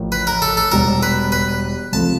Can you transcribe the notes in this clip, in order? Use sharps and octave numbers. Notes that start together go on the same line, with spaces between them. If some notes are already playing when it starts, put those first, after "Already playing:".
Already playing: A1 A2 F3 A#3
B4
A#4
A4
A4
E1 E2 B2 G3 A#4
B4
B4
C#2 C3 F3 A3 C4 A5